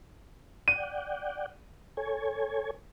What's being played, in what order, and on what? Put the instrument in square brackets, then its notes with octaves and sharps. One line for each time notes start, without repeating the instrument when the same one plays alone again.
[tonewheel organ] D5 F#5 G5 [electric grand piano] D#7
[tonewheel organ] A4 C#5 G#5